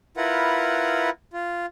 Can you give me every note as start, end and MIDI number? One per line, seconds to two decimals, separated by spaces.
0.17 1.10 64
0.17 1.10 65
0.17 1.10 70
0.17 1.10 71
0.17 1.10 78
1.33 1.66 65